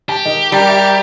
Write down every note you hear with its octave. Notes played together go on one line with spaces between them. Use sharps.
G4 A5
D#3 D#4
G3 A#4
E5